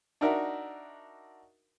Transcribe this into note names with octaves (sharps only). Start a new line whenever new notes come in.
D4 D#4 F#4 A#4 E5